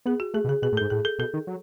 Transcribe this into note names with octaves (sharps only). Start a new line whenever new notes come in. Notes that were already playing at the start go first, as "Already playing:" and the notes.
B3 G#4
F#4
A3 G#4
B2
C#3 G#4
B2 G#4
A2
G#2 A4
A2 G#4
A4
B2 A4
D#3
F#3